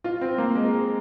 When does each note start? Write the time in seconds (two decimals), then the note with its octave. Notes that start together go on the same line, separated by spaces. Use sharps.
0.04 F4
0.21 C4
0.38 A#3
0.55 G#3